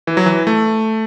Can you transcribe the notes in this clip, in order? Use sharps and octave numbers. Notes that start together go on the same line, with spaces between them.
E3
F#3
E3
A3